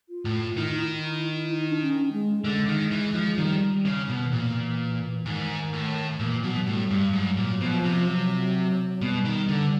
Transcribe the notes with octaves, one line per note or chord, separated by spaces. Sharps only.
F4
A2
D#3 E4
D#4
E4
D#4
D4
C#4
G#3
D3 G#3
D#3
E3
F3
D#3 G3
C#3
B2
D#3
A#2 E3
G#2 D#3
A2
A#2 E3
B2 F#3
F#3
A2 G3
G2 G3
G#2 F#3
A#2
B2 F3
C3
F#3
B2 G3
D#3
D3